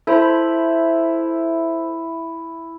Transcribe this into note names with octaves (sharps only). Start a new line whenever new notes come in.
E4 A4 C5 B5